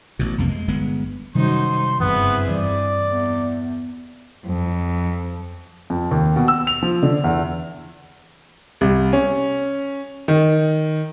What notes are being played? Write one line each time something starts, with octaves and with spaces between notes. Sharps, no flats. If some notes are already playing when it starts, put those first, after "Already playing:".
A1 B2
B1 F2 C3 A#3
G#3
G1 G#3 B3
F#2 C3 D#3 G3 D#4 C5 C6
F#1 G2 E3 B3 C4 E4 G#4
G2 E3 D5
E2
F2
F2
D#2
B2
E6
F7
F3
D3
E2
C2
C#4
D#3